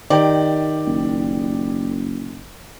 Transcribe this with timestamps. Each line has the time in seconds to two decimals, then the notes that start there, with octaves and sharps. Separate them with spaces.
0.10 D#3 G4 D5
0.86 F#1